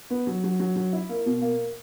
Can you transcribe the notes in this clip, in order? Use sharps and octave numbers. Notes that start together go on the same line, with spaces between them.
B3
F#3
F#3
F#3
F#3
E4
A#3
B2
A#3